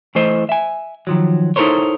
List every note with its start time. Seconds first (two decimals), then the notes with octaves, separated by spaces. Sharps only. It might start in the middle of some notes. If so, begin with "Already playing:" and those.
0.15 E3 A3 E4 C5 D#5
0.49 E5 G#5
1.07 D#3 F3 F#3
1.56 D#4 E4 A4 A#4 C5 C#5